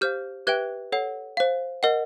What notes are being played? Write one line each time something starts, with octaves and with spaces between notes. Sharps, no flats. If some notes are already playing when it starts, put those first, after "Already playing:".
G4 C5 F5 F6 G6
G4 B4 E5 G5 F#6 G#6
A4 C#5 F#5
C5 F5
A#4 D#5 F#5